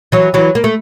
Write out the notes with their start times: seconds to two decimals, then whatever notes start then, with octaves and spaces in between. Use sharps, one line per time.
0.12 E3 F#3
0.34 E3 F#3
0.55 A#3
0.64 A3